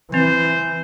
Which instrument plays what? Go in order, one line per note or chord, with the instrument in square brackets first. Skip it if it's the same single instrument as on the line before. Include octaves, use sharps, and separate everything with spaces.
[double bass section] E3 [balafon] C4 [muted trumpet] C5